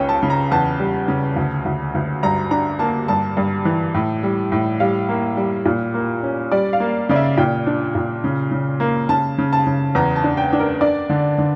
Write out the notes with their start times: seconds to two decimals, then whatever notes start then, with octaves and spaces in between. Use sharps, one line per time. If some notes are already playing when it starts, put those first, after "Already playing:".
Already playing: C#2 C#4 G5
0.09 A5
0.23 C#3
0.30 A#5
0.51 E2 A5
0.79 G3
1.08 C#3
1.36 D2
1.65 D2
1.95 D2
2.23 G2 A#5
2.51 D4 A#5
2.79 A#3 A5
3.08 G2 A5
3.37 G2
3.65 E3
3.94 A2
4.23 G3
4.52 A2
4.80 G3 F5
5.09 A#3
5.37 G3
5.66 A#2
5.94 A#3
6.23 C#4
6.52 G3 D5
6.73 F5
6.80 A#3
7.09 C#3 D5
7.16 E5
7.37 A#2 G5
7.67 D4
7.95 A#2
8.24 C#3
8.51 C#3
8.80 A#3
9.09 C#3 A5
9.38 C#3
9.53 A5
9.67 C#3
9.95 E2 A#5
10.16 A5
10.24 D4
10.37 G5
10.53 D4
10.59 A#4
10.81 D4 D5
11.10 D3
11.38 D3